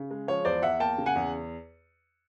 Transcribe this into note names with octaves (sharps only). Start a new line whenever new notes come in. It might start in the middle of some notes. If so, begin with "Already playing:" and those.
Already playing: C#3
G#3
F3 C#5
E2 C5 D5
E2 E5 F#5
A#3 G5 A5
C#3
F#5 G#5
E2